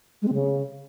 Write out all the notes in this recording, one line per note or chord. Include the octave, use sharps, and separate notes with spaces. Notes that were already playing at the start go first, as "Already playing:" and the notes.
G#3
C4
C#3